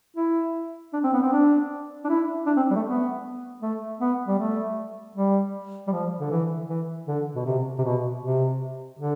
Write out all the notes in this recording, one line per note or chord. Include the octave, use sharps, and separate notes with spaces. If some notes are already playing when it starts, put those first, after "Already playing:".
E4
D4
C4
B3
C4
D4
D4
E4
D4
C4
G3
A3
B3
A3
B3
G3
A3
G3
G3
F3
D3
E3
E3
D3
B2
C3
C3
B2
C3
D3